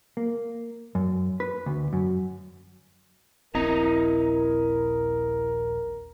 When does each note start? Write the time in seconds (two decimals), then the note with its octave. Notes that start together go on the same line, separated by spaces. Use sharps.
0.17 A#3
0.95 F#2
1.40 B4
1.66 D2
1.93 F#2
3.55 D#1 A#1 C4 E4 A#4 D#5 A#5